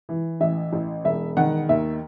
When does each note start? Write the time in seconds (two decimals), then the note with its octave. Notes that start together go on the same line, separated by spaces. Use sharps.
0.09 E3
0.41 A1 E5
0.73 A1
1.05 E1 E5
1.37 D#3 F#5
1.69 D#2 E5